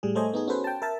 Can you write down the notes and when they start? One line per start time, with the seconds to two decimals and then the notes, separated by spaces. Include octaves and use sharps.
0.03 A2 G3 G#4
0.15 A3 A4 C5 C#5 D#5 G#5
0.33 B3 D#4 G#4
0.48 C#4 F#4 A4 B4 C5
0.64 G5 A5
0.82 A#4 E5 A5